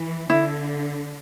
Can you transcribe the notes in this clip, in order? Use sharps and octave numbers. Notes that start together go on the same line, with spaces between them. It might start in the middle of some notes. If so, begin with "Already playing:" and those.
Already playing: E3
D3 E4